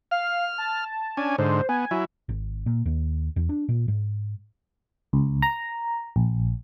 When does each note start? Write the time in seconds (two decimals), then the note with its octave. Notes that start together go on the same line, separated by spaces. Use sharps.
0.11 F5 F6
0.58 A5
1.17 C#4 D4 G#5
1.38 G#2 D3 C5
1.69 B3 G#5
1.91 F#3 E4
2.29 G#1
2.66 A#2
2.86 D#2
3.36 E2
3.49 D4
3.69 A#2
3.88 G#2
5.13 C#2
5.42 A#5
6.16 A#1